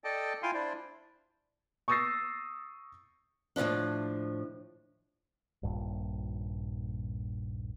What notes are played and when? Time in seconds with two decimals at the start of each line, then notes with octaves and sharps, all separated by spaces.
0.04 A4 D5 D#5 G5 A5
0.43 E4 F4 F5 G5 G#5 C6
0.54 D4 E4 C5 D5
1.88 C#6 D#6 E6 A6 A#6 C7
3.56 D#2 A2 D#3 F3 D4
5.63 D#1 A#1 G2